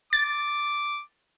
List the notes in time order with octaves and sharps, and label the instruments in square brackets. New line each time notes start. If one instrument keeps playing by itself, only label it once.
[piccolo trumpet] D6 [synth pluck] A6